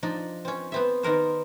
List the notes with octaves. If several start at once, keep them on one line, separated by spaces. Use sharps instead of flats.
F3 D4 D#4
C4 C#4
B3 C4 E5
D#3 B3 A#4 C5